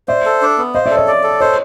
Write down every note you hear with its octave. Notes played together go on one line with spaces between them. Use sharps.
C5 D5 E5
A4
D4
B3
C5 D#5 F5
D5 E5
A4
C#5 D#5
D5
A4
C5 C#5 D#5